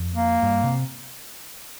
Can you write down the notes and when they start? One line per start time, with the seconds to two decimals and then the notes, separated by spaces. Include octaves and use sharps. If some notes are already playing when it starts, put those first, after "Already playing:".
Already playing: F2
0.15 A#3
0.43 G2
0.64 C3